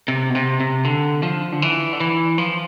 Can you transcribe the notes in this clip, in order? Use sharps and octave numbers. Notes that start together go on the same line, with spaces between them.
C3
B2
C3
C3
D3
F3
D3
E3
D3
E3
F3